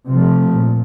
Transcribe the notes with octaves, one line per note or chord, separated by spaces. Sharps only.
C3 F3 A3 C4
A#2